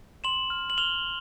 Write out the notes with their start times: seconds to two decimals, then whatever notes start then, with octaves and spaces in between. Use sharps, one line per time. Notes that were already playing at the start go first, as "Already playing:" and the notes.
0.24 C6 E7 F#7
0.50 F6
0.70 F#7
0.78 F6 F7 G7